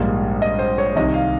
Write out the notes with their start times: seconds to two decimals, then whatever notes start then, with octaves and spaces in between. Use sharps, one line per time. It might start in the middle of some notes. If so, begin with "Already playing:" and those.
Already playing: A#1 G#2 G3 A#3
0.42 D#5
0.59 C5
0.78 C#5
0.96 C2 C3 D#3 D#5
1.14 F5